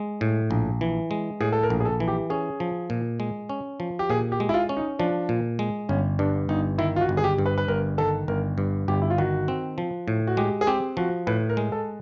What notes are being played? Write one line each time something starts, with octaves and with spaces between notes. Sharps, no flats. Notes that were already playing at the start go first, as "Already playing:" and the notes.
Already playing: G#3
A2
A#1
E3
G#3
A2 G#4
A4
A#4
A#1
G#4
A4
E3
G4
C#4 G#4
F3
A#2
G#3
C#4
F3
G4
A#2 G#4
G4
G#3
E4
F4
C#4
D#4
F3 D4
A#2
G#3
G1 C#4
G2 D4
G1 D#4
D#3 E4
F4
F#4
G1
G#4
G4
G2
B4
B4
G1 A#4
D#3 A4
G1 A#4
G2
G1 G4
E4
F4
D#3 F#4
C4
F3
A2
F#4
G#3 G4
G#4
C4 G4
F3 F#4
A2 B4
A#4
G#3
A4